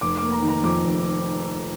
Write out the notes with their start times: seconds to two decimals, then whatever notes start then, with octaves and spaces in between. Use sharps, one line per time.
0.01 F1 D6
0.17 A#3 D6
0.32 A#5
0.42 D#3
0.48 A#5
0.64 F2 D6
0.84 F1